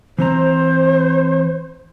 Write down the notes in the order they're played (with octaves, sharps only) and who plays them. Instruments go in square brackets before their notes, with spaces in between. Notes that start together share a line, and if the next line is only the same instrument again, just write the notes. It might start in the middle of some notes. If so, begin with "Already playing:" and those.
[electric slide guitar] E3 C4 A#5 [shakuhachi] C5